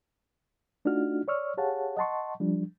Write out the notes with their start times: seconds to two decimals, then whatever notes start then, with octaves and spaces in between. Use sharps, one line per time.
0.85 A3 D4 D#4 F4 F#4 F6
1.28 C#5 D5 C#6 E6 F6
1.57 G4 G#4 C#5 F5 F#5 A5
1.97 D#5 F#5 A5 C6 C#6
2.40 F3 G3 D4